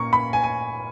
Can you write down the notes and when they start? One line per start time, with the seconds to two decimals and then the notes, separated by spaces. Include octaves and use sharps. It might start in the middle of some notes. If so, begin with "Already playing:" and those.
Already playing: A#2 A#3 C#4 A#5 C#6
0.13 B5
0.33 G#5
0.44 G#5